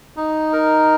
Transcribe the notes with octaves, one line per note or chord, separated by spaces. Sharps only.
D#4
A#4